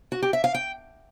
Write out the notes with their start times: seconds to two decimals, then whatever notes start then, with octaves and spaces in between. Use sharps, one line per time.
0.12 F#4
0.22 G4
0.33 E5
0.44 F5
0.54 G5